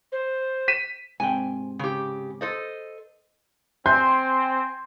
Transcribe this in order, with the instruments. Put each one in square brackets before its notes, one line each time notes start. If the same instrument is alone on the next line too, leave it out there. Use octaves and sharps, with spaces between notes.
[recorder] C5
[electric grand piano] B6 D#7 E7
[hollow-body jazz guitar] G#2 C3 G5 [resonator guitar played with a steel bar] G#5
[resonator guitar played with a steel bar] C#3 G4
A4 C5 D#5
[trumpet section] C4 [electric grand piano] G#5 C6 [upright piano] G6